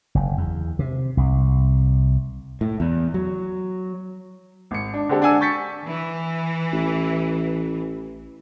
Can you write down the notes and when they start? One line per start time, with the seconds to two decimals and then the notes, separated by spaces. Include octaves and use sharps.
0.15 F#1
0.38 E2
0.79 C3
1.17 C2
2.61 A2
2.80 E2
3.14 F#3
4.71 G#1 C#7
4.94 D4
5.09 D3 G#3 C4 D4 G4 A4
5.22 D4 F#5 G#5 E6
5.41 C#6 G6 A6 B6 C#7
5.87 E3
6.73 A1